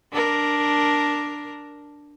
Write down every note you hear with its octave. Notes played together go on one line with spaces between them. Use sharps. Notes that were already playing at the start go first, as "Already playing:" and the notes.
D4 A#4